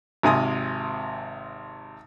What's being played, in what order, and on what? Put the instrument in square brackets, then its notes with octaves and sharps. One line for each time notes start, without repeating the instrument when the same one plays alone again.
[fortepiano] G#1 C3 G#5 D#6